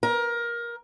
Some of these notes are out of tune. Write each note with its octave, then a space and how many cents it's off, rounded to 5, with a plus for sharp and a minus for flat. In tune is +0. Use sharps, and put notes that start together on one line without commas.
A#4 +20